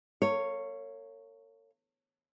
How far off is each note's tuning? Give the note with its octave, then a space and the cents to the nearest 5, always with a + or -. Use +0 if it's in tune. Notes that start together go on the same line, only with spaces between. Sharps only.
A#4 -45 C#5 +0 F5 -5